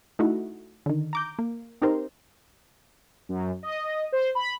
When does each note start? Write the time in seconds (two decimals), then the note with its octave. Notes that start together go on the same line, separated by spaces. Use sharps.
0.19 A3 D#4 E4 F#4
0.86 D3 D#3
1.13 A#5 D6 G6
1.39 A#3
1.82 C4 D#4 G4 A#4 C5
3.29 F#2
3.63 D#5
4.12 C5
4.35 B5